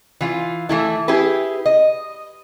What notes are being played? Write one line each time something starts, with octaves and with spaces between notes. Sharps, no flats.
E3 F4
E3 A3 E4
E4 G4 G#4 B4
D#5